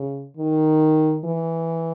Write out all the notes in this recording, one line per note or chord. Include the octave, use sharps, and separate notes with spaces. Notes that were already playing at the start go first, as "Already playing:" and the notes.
Already playing: C#3
D#3
E3